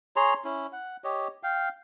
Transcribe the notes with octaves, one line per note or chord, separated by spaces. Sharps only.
G#4 C#5 A#5 C6
C#4 E4
F#5
G4 C#5 D#5
F5 G5